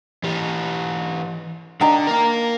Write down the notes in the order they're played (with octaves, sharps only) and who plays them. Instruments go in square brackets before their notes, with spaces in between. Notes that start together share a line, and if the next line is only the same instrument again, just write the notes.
[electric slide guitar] E3 G4
[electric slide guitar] D3 D4 [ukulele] D#4 G5 A#5
[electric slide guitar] A#3 A#4